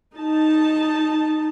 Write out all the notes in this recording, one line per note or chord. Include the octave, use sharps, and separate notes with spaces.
D#4 A5